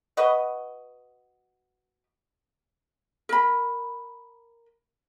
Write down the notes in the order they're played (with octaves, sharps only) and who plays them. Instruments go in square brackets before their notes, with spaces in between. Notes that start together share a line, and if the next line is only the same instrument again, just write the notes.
[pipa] F#4 B4 D#5
[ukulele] A#4 B5